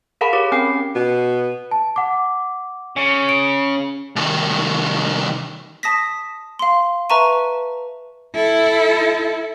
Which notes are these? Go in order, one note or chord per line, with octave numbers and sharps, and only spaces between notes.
G#4 A#4 F5 F#5 A5 B5
G4 A#4 C#5 D6
C4 C#4 G5 G#5 D6 C7
B2
A5
F#5 D6
C#3
D7
C2 D#3
A5 D#6 A#6 B6
F5 C6
B4 E5 A5 A#5 C#6 D#7
E4 A4